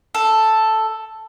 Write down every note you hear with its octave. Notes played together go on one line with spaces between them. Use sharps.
A4